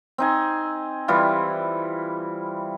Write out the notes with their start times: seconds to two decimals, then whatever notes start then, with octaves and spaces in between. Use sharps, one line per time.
0.18 C4 D#4 G#5
1.08 E3 G3 E4 F4